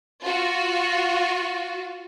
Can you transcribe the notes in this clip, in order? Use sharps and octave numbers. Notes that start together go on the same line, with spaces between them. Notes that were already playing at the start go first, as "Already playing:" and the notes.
F4 F#4